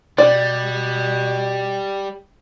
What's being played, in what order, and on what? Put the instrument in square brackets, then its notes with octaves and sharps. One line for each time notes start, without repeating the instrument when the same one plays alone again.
[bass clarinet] B2 [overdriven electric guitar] G3 [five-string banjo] D5